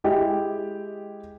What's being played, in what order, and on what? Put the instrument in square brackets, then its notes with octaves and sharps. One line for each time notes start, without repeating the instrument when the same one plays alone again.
[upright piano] G#3 E4 G4 D#5 G5